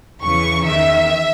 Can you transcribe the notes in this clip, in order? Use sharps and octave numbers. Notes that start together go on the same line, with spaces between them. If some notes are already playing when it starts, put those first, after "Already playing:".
E2 C#3 E3 C#6
E2 D#3 E5